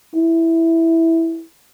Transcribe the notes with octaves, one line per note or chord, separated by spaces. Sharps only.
E4